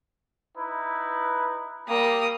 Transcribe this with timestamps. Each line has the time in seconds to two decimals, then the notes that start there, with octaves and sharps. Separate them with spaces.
0.56 D#4 E4 B4
1.88 G3 A#3 D#6